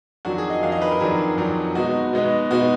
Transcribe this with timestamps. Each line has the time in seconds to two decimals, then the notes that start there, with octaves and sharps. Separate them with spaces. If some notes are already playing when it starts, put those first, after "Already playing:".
0.25 F2 D#3 F#3 D4 F#4
0.38 G#4
0.50 D#5
0.63 F2 D#3 F#3 D4 F5
0.72 D#5
0.82 B4
0.91 A#4
1.00 F2 D#3 F#3 D4 G#4
1.37 F2 D#3 F#3 D4
1.75 B2 G#3 B3 D#4 F#4
2.13 B2 G#3 B3 D#4
2.51 B2 G#3 B3 D#4 F#4